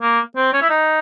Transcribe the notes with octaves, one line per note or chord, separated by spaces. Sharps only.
A#3
C4
C#4
E4
D#4